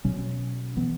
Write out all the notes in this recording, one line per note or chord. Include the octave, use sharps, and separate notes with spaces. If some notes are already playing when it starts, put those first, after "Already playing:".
B2 F#3 C#4
E3 B3